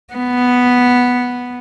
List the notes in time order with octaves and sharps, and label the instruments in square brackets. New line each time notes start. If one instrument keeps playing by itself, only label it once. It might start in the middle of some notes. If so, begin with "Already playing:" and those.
[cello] B3